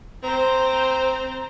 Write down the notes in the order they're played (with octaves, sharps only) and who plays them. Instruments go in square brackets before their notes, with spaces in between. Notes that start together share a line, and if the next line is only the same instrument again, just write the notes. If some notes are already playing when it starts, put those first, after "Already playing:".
[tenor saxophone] C4 [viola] C5 A#5